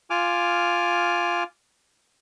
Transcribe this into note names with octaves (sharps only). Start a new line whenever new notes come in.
F4 G#5 D6 F6